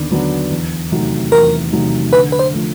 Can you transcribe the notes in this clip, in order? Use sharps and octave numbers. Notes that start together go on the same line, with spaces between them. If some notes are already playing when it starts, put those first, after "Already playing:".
Already playing: D#2 D3 B3 D4
D3 F#3 B3 D4
E2
C3 D#3 F#3 A3
E2 A#4
C3 D#3 F#3 A3
D3 B4
B4
C5
F3 A3